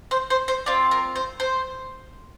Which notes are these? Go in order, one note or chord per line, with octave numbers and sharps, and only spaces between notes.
C5
C5
C5
C4 F4 D5
A#4
C5
C5